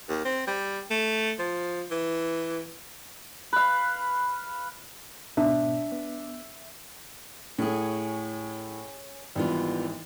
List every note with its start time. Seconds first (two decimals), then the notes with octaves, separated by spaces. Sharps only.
0.09 D#2
0.25 C4
0.47 G3
0.91 A3
1.39 F3
1.91 E3
3.53 B4 F5
5.37 G#2 B2 B3 D4 E5
5.92 B3
7.58 A2 C#4 G#4
9.35 G#1 E3 G3 B3 F4